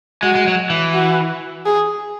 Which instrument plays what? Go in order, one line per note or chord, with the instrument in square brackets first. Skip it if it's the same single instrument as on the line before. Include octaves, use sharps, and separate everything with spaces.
[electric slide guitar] G#3 [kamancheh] F#4
[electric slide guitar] G#3
F#3
E3
[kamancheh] F#4
G#4